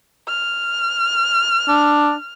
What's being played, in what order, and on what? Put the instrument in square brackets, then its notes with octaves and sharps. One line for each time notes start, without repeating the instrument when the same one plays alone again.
[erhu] F6
[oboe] D4